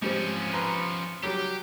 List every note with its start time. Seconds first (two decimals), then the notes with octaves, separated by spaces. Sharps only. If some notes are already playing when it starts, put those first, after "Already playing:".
0.02 G#2 F3 G3 C4 C#4
0.53 B4 A#5 C6
1.23 F#3 G3 G4